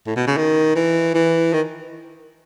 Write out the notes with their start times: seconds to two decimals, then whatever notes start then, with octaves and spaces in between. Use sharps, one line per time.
0.07 A2
0.16 B2
0.27 C#3
0.37 D#3
0.76 E3
1.14 E3
1.53 D#3